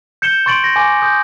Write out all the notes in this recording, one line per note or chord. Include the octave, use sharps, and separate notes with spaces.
G6 C#7 E7 G7
C6 C#6 A6 D7 F#7
A#6
G#5 D6
D#6 G6